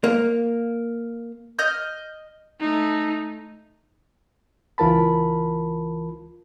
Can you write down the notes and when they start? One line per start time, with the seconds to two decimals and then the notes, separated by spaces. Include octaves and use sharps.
0.04 A#3
1.59 D#5 F6 G6
2.60 A3 D#4
4.78 C#2 E3 F4 A#4 A5 B5